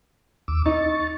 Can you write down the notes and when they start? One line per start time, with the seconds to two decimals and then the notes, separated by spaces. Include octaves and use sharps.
0.48 D#2 D6 E6
0.66 D#4 C#6 A6